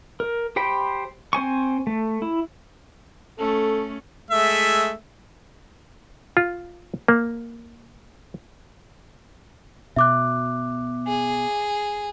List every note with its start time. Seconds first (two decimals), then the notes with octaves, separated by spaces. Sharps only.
0.20 A#4
0.56 G4 C5 G5 B5
1.33 C4 C5 G#5 C#6
1.87 A3
2.22 E4
3.38 A3 C#4 A4
4.30 G#3 A3 E5
6.37 F4
7.08 A#3
9.96 B2 E5 D6 F#6
11.07 G#4